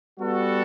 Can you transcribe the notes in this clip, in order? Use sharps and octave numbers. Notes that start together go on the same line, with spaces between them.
G3 B3 F#4 A4